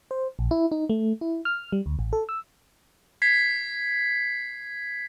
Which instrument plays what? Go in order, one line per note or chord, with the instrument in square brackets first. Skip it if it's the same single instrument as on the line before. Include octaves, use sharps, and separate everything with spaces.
[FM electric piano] C5
A#1
E4
D#4
A3
E4
F6
G3
D2
A1
A4
E6
[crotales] G#6 B6 C7